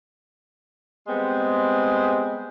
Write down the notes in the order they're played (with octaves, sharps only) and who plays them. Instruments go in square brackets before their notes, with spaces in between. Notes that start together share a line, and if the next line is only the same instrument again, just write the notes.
[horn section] G3 G#3 B3 C4